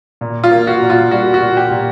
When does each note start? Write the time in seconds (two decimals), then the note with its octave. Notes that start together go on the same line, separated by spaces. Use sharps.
0.21 A#2
0.44 F4
0.51 A#3
0.67 F#4
0.82 A#2
0.90 F4
1.11 G3 F#4
1.34 F#4
1.42 A#2
1.57 G4
1.71 A#2